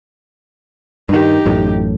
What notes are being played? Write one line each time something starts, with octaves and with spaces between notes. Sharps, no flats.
G2 D#3 D#4 G4
A1 F#2 A2